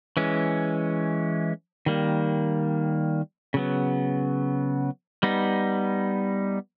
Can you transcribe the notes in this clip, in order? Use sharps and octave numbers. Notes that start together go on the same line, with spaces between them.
E3 G#3 C#4
D#3 G3 A#3
C#3 F#3 B3
G3 B3 D#4